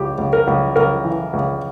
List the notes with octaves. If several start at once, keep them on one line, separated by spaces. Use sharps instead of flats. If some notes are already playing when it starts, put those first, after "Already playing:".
Already playing: C#2 G4
C#2
A#4
C#2
C#2 A#4
E3
C#2